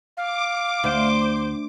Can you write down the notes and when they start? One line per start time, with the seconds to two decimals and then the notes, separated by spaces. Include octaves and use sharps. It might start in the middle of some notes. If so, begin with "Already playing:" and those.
0.17 F5 D6
0.84 D2 C5